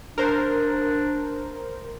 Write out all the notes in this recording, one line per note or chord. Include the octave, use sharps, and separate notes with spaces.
D4 A#4 C5